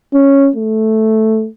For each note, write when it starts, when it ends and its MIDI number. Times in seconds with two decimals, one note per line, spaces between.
0.14 0.50 61
0.56 1.47 57